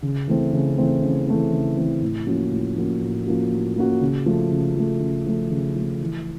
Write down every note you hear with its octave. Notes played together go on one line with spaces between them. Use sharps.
C#3
E3 A3 C4
C#3
E3 A3 C4
C#3
E3 A3 C4
C#3
E3 A3 C4
A2
F3 A#3 C#4 F#4
A2
F3 A#3 C#4 F#4
A2
F3 A#3 C#4 F#4
A2
F3 A#3 C#4 F#4
C#3
F3 A3
C#3
F3 A3
C#3
F3 A3
C#3
F3 A3
E3